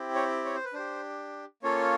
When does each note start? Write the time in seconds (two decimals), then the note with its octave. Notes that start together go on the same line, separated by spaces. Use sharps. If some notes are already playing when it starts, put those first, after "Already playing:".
Already playing: C4 E4 G4
0.15 C#5
0.45 C#5
0.55 C5
0.65 B4
0.73 D4 G4 C5
1.63 A#3 C#4 F4 A4 C#5